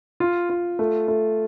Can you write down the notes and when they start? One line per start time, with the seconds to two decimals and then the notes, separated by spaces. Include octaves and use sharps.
0.20 F4
0.50 F4
0.79 A3
1.08 A3